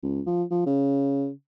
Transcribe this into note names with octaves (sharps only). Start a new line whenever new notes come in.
C#2
F3
F3
C#3